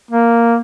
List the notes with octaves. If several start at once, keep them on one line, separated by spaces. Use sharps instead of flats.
A#3